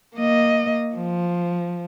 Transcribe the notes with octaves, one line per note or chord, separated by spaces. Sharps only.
A#3 D#5
F3